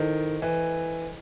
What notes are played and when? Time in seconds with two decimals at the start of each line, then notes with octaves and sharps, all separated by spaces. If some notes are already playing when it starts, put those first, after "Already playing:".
Already playing: D#3 E4 A4 C5 D#5
0.42 E3